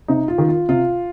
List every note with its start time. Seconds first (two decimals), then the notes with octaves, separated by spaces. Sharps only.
0.08 C3 D#4
0.28 F4
0.38 D#3
0.48 F4
0.69 C3 F4